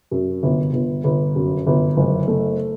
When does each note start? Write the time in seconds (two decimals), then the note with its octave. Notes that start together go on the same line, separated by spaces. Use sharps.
0.11 F#2
0.43 G1
0.73 G1
1.04 G1
1.36 F#2
1.67 G1
1.97 F#1
2.28 A3